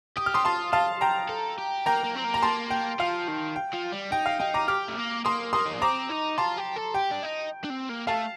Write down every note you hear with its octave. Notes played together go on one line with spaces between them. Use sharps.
G4 D#6
F6
C6 D#6
F4 A5 C6
F4 F5 A5
G5 A#5
A4
G4
A#3 G5 A#5
A#3
C4
A#3
A#5
A5 C6
G5
F3 F5
D#3
G5
F3
G3
D#4 G5
F5
D#4 G5
A#5 D6
G4 D6 F6
A3
A#3
A#3 C6 D#6
A#3 C6 D#6
D#4
D4
C4 A#5 D6
D#4
F4 A5 C6
G4
A4
G4 G5
D4
D#4
D4
C4
A#3
A3 F5 A5